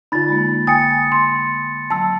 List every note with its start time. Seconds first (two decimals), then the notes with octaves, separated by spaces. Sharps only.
0.12 D3 D#4 F4 B5 A6
0.28 G#3 A#3
0.67 G5 G#5 D#6 A6 C#7
1.12 C6
1.90 D#3 F#3 A5 E6